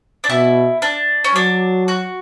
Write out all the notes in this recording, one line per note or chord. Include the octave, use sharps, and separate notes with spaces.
D4
B2 E4
D4
C#4
F#3 D4
F#4